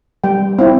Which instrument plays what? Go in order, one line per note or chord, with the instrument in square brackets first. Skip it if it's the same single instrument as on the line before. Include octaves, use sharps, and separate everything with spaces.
[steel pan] G3 G5
C4 E4